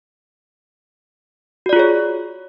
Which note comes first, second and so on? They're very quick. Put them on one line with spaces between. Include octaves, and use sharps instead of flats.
F#4 D5 F4 G#4 C#5